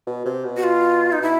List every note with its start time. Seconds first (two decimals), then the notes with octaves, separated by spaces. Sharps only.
0.07 B2
0.26 C3
0.45 B2
0.57 F#4
0.64 F4
1.12 D#4
1.21 B2 E4